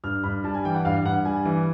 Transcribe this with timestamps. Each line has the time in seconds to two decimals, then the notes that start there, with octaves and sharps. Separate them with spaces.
0.04 G2 F6
0.24 G2 B5
0.44 G3 A5
0.54 G#5
0.65 E3 G5
0.75 F#5
0.85 G2 F5
1.05 G2 F#5
1.25 G3 G#5
1.45 E3